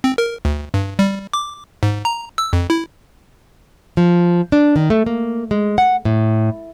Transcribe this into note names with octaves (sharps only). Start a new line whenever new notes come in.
C4
A#4
D2
G2
G3
D6
G#2
A#5
E6
F2
E4
F3
D4
D#3
A3
A#3
G#3
F#5
A2